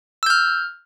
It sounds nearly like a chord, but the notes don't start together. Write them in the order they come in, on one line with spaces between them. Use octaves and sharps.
E6 G6 F6